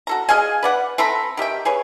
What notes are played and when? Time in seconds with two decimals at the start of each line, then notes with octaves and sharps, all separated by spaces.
0.07 F#4 A4 A#5
0.29 G#4 D#5 F5 G#5
0.63 B4 D5 F#5
0.98 C4 A4 A#5 B5
1.37 D#3 G4 E5 G5
1.65 G#4 B4 C#5